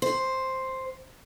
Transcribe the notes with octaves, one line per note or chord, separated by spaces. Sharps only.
C5